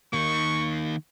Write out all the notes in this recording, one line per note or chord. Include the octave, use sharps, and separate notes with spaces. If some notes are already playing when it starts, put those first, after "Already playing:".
D#3 A#3 C#6